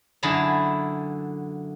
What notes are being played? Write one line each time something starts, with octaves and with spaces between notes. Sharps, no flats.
F#2 D3 E4 G#4 A5 A#5